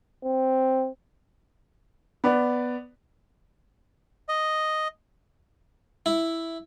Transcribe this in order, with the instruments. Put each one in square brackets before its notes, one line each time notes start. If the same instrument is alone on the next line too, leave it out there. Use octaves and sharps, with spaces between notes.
[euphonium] C4
[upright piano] B3 B4 D5
[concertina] D#5
[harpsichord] E4